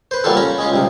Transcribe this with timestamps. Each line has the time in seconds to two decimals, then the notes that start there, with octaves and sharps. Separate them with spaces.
0.11 B4 C5
0.24 F#3 G3 A#3 F4 A4
0.37 C#4 A#5 B5
0.58 G#3 C#4 F4
0.72 C#2 G2 C3